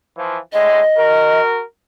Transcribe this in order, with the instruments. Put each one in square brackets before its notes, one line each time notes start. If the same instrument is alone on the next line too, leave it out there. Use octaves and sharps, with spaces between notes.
[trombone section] E3 F3
[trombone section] A2 D3 G#3 [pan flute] D#5
[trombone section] F#4 A#4